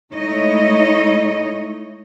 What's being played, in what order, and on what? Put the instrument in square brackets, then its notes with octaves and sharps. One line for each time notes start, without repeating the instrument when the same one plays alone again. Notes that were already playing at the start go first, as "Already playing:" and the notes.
[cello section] G#3 A3 D#4 E4 C#5 D#5